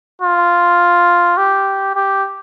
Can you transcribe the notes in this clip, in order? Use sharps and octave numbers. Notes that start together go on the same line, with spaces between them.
F4
G4
G4